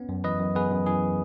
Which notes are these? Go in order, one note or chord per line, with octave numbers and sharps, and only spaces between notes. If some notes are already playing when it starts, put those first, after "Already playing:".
Already playing: B3 C#4
F#2
E3 B4 D#5
F#2
B3 G#4 B4
F#2
E3 G#4